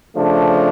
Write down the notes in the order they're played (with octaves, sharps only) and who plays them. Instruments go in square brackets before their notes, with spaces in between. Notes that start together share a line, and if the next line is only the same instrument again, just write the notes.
[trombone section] C#3 F3 A3 D4